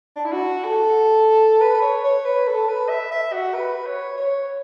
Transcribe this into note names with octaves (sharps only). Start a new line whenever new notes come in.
D4
E4
F#4
A4
B4
B4
C#5
C#5
B4
A4
B4
E5
E5
F#4
B4
C#5
C#5